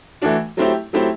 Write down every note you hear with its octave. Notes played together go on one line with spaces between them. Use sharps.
E3 A3 D4 F#4
F#3 A3 C4 E4 G4
F#3 A3 C4 E4 G4